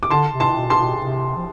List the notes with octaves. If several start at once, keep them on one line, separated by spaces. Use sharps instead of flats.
D6
D3 A5 C6
C3
A5 C6
B2
A5 C6
B2
C3
F3